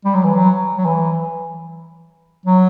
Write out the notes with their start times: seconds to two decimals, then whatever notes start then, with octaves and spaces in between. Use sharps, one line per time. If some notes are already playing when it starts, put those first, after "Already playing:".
0.05 G3
0.14 F#3
0.24 E3
0.35 F#3
0.77 F#3
0.85 E3
2.46 F#3